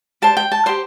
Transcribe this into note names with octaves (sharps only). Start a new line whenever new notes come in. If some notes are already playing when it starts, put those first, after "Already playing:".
G4 C5 A5
G5
A5
G4 C5 C6